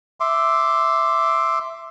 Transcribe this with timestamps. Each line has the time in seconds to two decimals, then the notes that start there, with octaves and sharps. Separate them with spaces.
0.20 E5 C6 D6